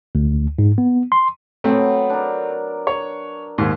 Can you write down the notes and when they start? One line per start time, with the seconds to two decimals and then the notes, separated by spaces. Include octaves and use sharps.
0.15 D2
0.59 G#2
0.78 B3
1.12 C6
1.64 F#3 A3 B3 C4
2.10 D4 A#4
2.87 C#5
3.58 D#2 G#2